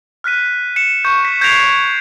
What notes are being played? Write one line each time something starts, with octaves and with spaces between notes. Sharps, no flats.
F6 F#6 B6 D#7
C#7 D#7 E7
C#6 G6
B6
G6 G#6 A#6 C7 D7 F7